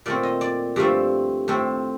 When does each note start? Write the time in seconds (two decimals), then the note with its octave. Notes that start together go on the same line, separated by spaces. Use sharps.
0.06 A#2 A3 C4 D5
0.23 D#5
0.41 D5
0.76 G2 F3 A3 C4 D5
1.48 A2 A3 C4